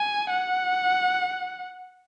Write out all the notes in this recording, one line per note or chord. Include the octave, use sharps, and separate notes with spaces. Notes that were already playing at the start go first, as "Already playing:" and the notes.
Already playing: G#5
F#5